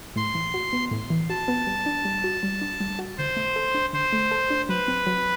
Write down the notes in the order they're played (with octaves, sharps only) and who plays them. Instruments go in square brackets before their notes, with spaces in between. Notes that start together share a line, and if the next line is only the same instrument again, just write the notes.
[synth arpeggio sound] A2 [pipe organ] C6
[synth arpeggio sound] E3
F#4
B3
A2
E3
[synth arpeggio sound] F#4 [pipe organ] A5
[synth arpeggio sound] B3
G3
D4
G3
F#4
G3
D4
G3
F#4
[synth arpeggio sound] D3 [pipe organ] C5
[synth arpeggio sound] A3
A4
D4
[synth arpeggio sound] D3 [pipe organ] C5
[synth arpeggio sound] A3
A4
D4
[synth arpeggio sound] F#3 [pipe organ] B4
[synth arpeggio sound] C4
F#3